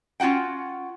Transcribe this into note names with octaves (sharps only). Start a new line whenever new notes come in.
C#4 F4 F#4 F#5 G5